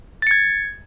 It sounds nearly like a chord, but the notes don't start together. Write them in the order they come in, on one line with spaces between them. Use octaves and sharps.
A6 C#7 G#6